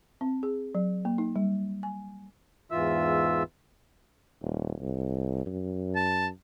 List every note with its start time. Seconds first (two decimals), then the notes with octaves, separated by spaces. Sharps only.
0.21 C4
0.43 G#4
0.75 F#3
1.05 A#3
1.18 D#4
1.36 G3
1.83 G#5
2.71 E2 G#2 E3 F4 E5 E6
4.41 D#1
4.80 C2
5.46 F#2
5.95 A5